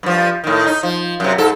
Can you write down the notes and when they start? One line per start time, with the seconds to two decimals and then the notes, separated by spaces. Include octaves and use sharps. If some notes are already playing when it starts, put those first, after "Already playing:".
0.03 G2 F3
0.44 A2 D#3
0.67 D#4
0.83 F3
1.20 F#2 C3
1.38 G#2 A4